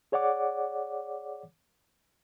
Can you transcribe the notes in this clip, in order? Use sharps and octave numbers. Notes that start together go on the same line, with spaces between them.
G#4 C#5 D5 F#5 D6